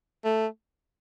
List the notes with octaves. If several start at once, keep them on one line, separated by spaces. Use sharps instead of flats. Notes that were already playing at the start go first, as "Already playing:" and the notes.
A3